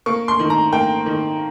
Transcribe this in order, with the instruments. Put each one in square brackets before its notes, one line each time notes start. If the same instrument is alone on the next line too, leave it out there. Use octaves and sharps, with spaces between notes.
[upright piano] A#3 C#6
C6
D#3
A#5
A#3 G5
D#3